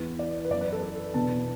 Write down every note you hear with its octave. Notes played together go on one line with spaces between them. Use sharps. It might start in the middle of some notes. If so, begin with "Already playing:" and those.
Already playing: E2 E3 B3
D5
B4
F#2 E3 B3 D5
B4
A4
A4
E2 B2 B3 D4 A5